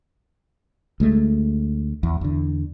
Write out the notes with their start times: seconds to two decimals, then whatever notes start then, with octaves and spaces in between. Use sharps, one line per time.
1.00 D2 G#3 A3
2.03 E2
2.21 E2 D3